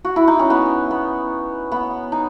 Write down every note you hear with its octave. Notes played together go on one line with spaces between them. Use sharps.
F#4
E4
D#4
C#4
B3
B3
B3
D#4